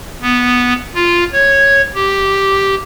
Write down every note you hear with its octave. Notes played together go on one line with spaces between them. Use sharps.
B3
F4
C#5
G4